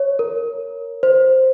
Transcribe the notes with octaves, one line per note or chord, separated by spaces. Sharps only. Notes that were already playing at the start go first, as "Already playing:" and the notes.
Already playing: C#5
A#4
C5